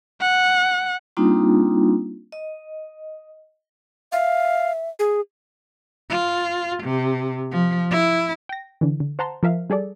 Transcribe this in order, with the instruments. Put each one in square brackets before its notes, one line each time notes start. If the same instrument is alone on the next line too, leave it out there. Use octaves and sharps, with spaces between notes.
[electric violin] F#5
[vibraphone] G3 A#3 C4 D4 D#4 F4
D#5
[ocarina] E5 [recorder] F5
[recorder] G#4
[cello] F4
C3
F3
E4
[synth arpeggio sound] G5 A#6
D3 E3
D3
C5 F#5 A5 A#5 C6
F3 A#4 E5 F5
G3 G#4 A4 D5